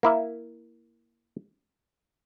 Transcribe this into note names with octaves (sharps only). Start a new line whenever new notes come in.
A#3 E4 E5